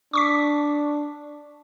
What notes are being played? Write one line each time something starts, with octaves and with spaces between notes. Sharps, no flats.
D4 C#6 D6 B6